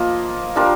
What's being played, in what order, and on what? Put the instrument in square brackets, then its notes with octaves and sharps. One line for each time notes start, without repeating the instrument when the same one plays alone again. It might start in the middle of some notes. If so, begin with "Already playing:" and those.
Already playing: [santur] F3 A#3 F4 A#4 D#5
G3 D4 F4 A#4